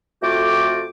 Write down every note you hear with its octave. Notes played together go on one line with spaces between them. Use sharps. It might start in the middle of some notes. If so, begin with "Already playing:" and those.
F2 A3 F4 F#4 G5 D6